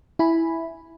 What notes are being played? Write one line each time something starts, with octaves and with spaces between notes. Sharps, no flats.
E4 G#5 B5